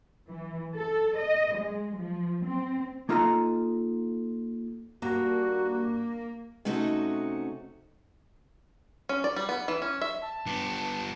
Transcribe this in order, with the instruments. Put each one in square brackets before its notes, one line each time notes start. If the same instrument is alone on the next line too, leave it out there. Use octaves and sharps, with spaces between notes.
[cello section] E3
A4
D#5
G#3
F3
C4
[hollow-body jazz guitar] A#3 D#4 F4 A4 D#5 A#5
[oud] G2 [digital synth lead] A#3 [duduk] F#4
[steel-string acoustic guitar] C3 A3 C#4 D#4 F#4 A4
[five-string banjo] C#4
D5
G3
B3
E3
C#4
E5
[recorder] A5
[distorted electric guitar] G2 B3